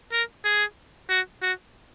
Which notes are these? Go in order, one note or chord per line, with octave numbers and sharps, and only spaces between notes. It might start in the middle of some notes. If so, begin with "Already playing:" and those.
A#4
G#4
F#4
F#4